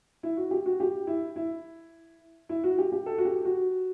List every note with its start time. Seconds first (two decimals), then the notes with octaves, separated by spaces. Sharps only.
0.23 E4
0.37 F#4
0.51 G4
0.66 F#4
0.80 G4
1.07 E4
1.36 E4
2.49 E4
2.64 F#4
2.78 G4
2.92 G4
3.06 A4
3.18 F#4
3.25 G4
3.45 F#4